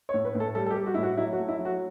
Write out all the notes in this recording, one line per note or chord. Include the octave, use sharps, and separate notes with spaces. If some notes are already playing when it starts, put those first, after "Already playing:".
C#5
A2
B4
A2
A4
G3 A4
A4
G4
G3
F#4
E4
A2
F#4
F#3 E4
F#4
A3
E4
F#3
F#4